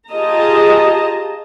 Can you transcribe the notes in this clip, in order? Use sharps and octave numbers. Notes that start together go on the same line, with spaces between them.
F4 G4 G#4 D#5 A5 A#5